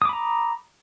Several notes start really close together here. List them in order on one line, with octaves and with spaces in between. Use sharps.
D#6 D6 B5 A#5